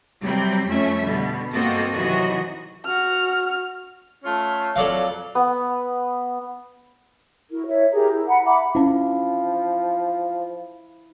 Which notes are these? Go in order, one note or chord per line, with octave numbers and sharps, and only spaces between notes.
C3 F#3 G3 C4
F2 A3 C#4 E5
B2 D3 G3
G2 A#3 C4 F#4 A4 D#5
D#2 C3 E3 F#3 F#4 D#5
F#4 F6
A3 C#4 F4
F2 F#3 A4 D5 F5
B3
E4 F#4 A#4
E4 A#4 C#5 E5
G4 G#4 A#4 A#5
E4
F#5 A#5 B5
E5 F#5 B5 D6
F3 C#4 D4 E4